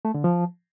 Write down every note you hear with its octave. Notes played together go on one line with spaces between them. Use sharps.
A3
D3
F3